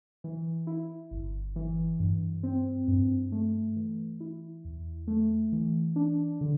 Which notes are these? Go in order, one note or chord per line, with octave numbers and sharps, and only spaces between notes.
E3
E4
G1
E3
G2
C4
G2
A3
E3
E4
E2
A3
E3
D4
D3